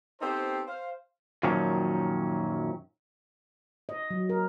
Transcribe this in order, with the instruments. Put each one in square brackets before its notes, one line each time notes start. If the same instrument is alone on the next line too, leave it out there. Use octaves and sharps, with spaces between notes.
[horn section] B3 C4 D#4 G4 A4 C5
C5 F5
[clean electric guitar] F#2 A#2 D#3 F3 F#3 C#4
[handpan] D#5
F#3
A#4